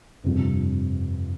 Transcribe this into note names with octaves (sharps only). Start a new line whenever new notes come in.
G1 F2 C3 G3 C4